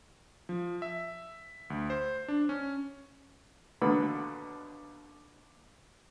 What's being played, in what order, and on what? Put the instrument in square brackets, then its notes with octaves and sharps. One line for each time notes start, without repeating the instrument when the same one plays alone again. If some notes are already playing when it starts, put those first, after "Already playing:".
[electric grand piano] F3
E5
D2
C5
D4
C#4
[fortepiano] D#2 B2 D3 B3 B5